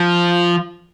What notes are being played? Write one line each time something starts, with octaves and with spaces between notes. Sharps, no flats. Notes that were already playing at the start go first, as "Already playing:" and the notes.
Already playing: F3